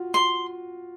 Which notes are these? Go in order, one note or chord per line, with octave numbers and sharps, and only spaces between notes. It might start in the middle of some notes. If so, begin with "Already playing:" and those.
Already playing: F4 F#4
C6